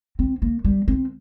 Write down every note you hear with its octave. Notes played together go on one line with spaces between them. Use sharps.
C4
A#3
G3
C4